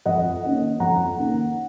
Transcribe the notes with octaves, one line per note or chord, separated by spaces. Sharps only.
F2 D#5 F#5
D#3 A#3 C#4
F2 F#5 A#5
D#3 A#3 C#4